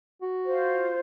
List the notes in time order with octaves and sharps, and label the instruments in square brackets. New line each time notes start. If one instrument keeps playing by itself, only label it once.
[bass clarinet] F#4
[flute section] F4 C5